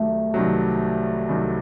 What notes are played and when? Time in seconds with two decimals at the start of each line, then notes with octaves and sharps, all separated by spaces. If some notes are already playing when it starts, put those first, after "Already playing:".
Already playing: C2 C3 D#3 F#3 A3
0.34 C2 C3 D#3 F#3
1.29 C2 C3 D#3 F#3